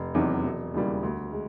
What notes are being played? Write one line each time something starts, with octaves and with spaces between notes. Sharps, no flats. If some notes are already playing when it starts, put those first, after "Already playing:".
Already playing: F1
E2 C3 D#3 F#3
E1
D#2 C#3 E3 G3
D2
G#3